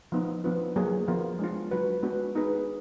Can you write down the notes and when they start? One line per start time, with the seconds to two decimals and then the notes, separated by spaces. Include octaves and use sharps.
0.12 F3 B3 D#4
0.44 F3 B3 D4 F4 B4
0.76 F#3 A#3 F4 G#4
1.08 F3 B3 F4 A#4
1.39 G#3 D4 F4
1.71 F#3 D4 F#4 B4
2.03 G#3 B3 D4 F#4 B4
2.35 B3 D#4 G#4 B4